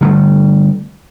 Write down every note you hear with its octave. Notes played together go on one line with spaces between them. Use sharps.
D3 G3 A3